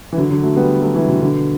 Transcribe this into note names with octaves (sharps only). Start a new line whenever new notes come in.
E3
D3 F#3
D3 F#3
F#3 A3
G3 B3
F#3 A3
E3 G3
B2 D3
B2 D3